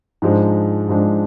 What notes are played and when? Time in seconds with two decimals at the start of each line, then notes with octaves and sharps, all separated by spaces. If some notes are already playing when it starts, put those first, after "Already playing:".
0.22 G#2 F3 G#3 D4
0.89 G#2 F3 G#3 D4